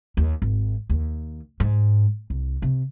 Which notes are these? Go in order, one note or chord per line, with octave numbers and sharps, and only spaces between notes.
D#2
G#1
D#2
G#2
C2
C3